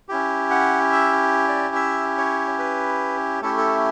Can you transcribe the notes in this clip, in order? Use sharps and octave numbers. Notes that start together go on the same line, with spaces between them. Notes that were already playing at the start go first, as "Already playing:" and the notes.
C#4 E4 G4
F#5
E5
D5
E5
C#5
B4
A3 C#4 E4 G4 A4
A4